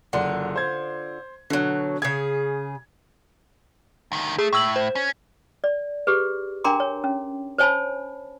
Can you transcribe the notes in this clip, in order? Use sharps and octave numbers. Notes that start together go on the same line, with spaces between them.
F#1 D3 F4 F#5
C5 G#6
B2 D3 F#3
C#3 G#4 G#6
D2 D#3
A3 G#4
A2 C#6 E6 F#7
C5
C#4
D5
G4 G#4 B4
D4 A#4 G5 A#5 C6 D6
C#5
C#4
C5 C#5 G#5 A5 B5